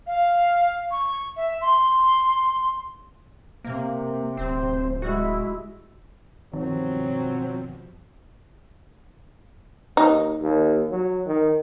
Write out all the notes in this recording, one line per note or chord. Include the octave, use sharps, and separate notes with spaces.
F5
C#6
E5
C6
C3 A#3
D1 C4 C5
G#3 E4 F#4
G2 B2 D#3 F3 F#3 C4
D#2 D#4
D#2
F#3
D#3